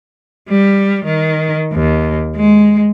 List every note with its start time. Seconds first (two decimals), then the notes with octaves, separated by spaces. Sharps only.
0.49 G3
1.05 D#3
1.73 D#2
2.36 G#3